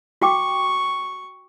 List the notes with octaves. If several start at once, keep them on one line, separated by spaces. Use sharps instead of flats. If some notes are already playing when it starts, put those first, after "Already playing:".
F#4 G5 C#6 D6